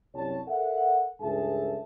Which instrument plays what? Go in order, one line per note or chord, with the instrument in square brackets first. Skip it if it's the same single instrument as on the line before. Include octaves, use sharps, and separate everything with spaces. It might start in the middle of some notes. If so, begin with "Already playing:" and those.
[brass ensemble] C2 F#2 G3 C#5 A5
A4 A#4 E5 F#5
C#2 G2 G#4 A4 E5 A5